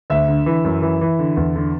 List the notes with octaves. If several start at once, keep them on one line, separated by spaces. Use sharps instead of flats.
D2 E5
D3
E3
F#2
E3
E3
D3
E2
D3